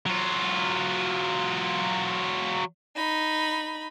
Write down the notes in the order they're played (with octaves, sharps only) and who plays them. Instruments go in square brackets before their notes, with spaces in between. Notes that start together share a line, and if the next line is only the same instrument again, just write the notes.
[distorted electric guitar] F#3 F4
[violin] D#4 B5